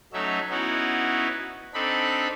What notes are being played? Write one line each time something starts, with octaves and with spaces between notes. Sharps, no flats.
F#3 A3 C#4 D#4 E5
B3 C#4 D#4 E4 F#4
C4 D4 D#4 A4 B5